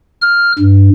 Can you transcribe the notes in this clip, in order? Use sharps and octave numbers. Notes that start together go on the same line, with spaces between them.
F6
G2